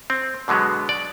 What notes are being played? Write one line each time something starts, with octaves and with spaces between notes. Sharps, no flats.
C4
B2 D3 F#3 G#3 B3
D5